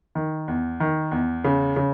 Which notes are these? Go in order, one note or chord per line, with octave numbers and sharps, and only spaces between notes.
D#3
E2
D#3
E2
C#3
C#3